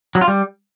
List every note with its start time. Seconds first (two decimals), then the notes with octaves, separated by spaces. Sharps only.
0.15 F#3
0.21 F4
0.28 G3